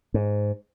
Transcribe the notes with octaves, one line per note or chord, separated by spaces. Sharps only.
G#2